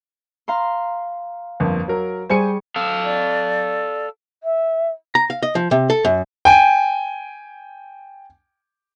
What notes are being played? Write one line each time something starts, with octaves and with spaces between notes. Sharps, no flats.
F5 A#5 C6
G1 F2 A#3
F#3 A#4
G3 G#4 C5 G#5 C#6 C#7
A4 F5
D5
E5
A#5
F5
D#5
F3
C3
A4
F#2
G5 G#5